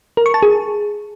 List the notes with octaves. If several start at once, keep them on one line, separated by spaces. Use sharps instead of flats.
A#4
C#6
A5
G#4